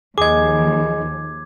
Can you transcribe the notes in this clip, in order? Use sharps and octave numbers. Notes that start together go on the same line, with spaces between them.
D#2 F3 G#4 D#5 D6 G#6